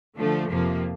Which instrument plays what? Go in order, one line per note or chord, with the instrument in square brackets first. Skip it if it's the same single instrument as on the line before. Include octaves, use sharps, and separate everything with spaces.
[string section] D3 F3 A3
F2 C3 F3 A#3